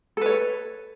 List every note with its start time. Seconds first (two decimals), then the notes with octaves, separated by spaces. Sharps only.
0.17 A4
0.21 B4
0.26 C#5